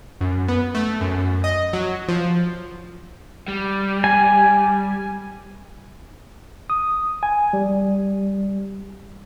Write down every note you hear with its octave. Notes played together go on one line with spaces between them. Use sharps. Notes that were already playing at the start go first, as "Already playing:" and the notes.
F#2
B3
A3
F#2
D#5
F#3
F3
G3
G#5
D#6
G#5
G3